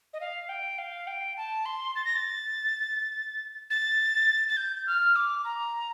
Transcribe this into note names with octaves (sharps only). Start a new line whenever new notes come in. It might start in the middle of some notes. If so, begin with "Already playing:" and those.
D#5
F5
G5
F5
G5
A5
C6
A6
A#6
A6
A6
A6
G6
F6
D6
A#5